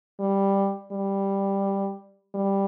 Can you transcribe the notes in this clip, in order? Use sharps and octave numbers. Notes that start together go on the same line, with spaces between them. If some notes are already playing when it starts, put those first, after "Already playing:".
G3
G3
G3